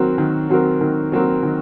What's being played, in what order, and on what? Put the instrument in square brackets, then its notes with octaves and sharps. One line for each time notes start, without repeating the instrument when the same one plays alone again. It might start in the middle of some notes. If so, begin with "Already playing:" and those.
Already playing: [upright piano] D#3 F#3 C4 F#4 A#4
D#3
F#3 C4 F#4 A#4
D#3
F#3 C4 F#4 A#4
D#3